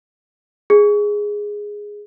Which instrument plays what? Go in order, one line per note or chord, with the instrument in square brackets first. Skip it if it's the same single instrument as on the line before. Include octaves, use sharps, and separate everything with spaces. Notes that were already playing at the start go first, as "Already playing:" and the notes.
[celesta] G#4